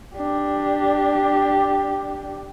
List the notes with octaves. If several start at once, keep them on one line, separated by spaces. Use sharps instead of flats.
D4 G4